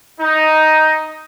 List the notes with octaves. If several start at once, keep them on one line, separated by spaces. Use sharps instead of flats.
D#4